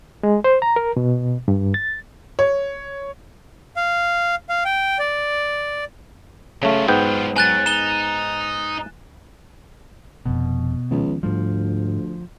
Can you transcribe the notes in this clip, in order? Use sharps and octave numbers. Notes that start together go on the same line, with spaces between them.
G#3
C5
A#5
A#4
B2
G2
A6
C#5
F5
F5
G5
D5
C#3 F#3 A3 F4
G#2 B3 G5
F#3 G#5 F#6 A6
D#4 E7 G7
F1 F2 B2
C#2 D#3 F3 B3
D2 G#2 F3 G3